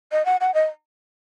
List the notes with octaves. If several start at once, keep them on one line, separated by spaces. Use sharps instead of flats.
D#5
F#5
F#5
D#5